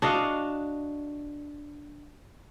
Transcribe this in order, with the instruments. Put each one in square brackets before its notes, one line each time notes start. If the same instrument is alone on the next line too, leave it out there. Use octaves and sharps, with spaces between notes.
[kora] D4 F#4 D#5 F5